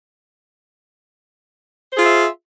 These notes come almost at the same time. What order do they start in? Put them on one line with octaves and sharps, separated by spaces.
C5 G#4 F4 E5